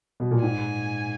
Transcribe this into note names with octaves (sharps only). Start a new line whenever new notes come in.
B2
A#2
G#2 G#5